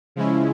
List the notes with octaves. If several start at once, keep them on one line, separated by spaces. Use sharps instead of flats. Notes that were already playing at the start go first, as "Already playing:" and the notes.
C#3 F3 G#3 C#4 E4